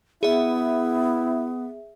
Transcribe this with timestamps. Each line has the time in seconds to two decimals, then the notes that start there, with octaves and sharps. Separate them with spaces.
0.23 B3 E4 G#4 E5